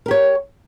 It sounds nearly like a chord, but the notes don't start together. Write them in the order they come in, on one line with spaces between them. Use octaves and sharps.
A#4 G4 C#5